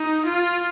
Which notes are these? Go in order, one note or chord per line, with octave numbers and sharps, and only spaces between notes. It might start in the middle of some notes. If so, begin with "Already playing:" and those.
Already playing: D#4
F4